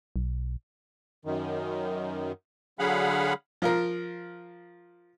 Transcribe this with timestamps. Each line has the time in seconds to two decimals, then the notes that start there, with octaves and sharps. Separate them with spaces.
0.16 B1
1.25 F#2 D#3
2.79 D3 F#3 G#4 F5 F#5 B5
3.62 F3 F4 A#4